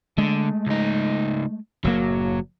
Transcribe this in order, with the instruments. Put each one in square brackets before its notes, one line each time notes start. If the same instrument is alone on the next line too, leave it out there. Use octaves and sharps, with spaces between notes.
[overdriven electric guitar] D3 [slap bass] G#3 A3
[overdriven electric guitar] C#2 D#4
[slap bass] F#1 A2 A#3 [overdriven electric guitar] F#3